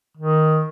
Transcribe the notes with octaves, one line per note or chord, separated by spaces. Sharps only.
D#3